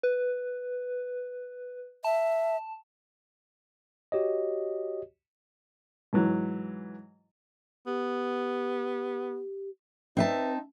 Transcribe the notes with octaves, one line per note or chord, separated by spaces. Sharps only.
B4
E5 A5
F#4 G4 C#5 D#5
G#2 E3 F#3
B3 G4
C4 D#4 B4 E5 A5